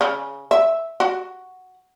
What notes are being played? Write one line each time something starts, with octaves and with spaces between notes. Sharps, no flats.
C#3
E5
F#4